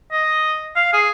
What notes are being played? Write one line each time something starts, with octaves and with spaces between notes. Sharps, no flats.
D#5
F5
G#4